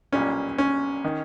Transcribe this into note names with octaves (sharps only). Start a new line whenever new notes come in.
B1 A#2 G3 C#4
C#4
D#3